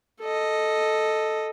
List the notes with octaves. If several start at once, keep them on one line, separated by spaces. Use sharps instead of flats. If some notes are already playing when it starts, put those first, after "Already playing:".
A4 D#5